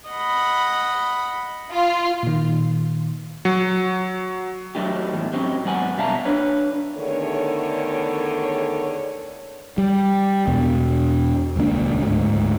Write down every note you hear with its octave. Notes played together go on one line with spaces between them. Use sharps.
D#5 F#5 B5
F4
A#2 D#3
F#3 C#7
F#3 A3 D#4 G4
E2 A2 A3
F#3 C4 C#4 D#4 G4
G#2 F#3 B3 F#5 G#5
B2 G3 E5 F5 A5 A#5
D4 B4 C#5
E2 D3 D#3 A3 C#5
G3
E2 B2
D#1 C#2 A#3 D4
D2 G#2